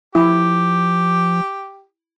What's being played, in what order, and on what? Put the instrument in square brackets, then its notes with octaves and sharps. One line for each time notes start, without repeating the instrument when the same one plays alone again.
[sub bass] F3 [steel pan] E4 [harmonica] G4